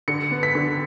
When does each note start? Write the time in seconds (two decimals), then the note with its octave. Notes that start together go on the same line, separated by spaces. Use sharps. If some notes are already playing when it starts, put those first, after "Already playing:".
0.08 D3 C#7
0.31 B3
0.43 B6
0.55 D3